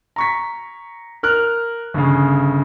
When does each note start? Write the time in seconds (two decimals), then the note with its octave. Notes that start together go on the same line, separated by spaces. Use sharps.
0.16 A#5 C#6 B6
1.23 A#4 F6 F#6
1.94 G1 C#3